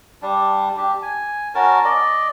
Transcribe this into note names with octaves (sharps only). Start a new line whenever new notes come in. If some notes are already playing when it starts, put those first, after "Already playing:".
G3 D4
D4 G4
G#5
C#4 F#4 A#4 A5
D5 D#5